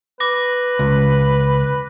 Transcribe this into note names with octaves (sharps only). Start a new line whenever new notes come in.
B4 D6 A#6
C#2